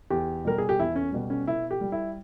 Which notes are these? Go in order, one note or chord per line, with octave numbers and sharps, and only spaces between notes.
E2 G4
B2 G3 A#4
G#4
G4
E2 E4
C#4
B2 G3
C#4
B2 E4
G4
G3
E4